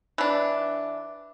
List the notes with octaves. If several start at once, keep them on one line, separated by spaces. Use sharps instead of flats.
E3 D4